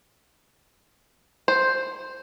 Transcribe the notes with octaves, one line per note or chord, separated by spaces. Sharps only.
C5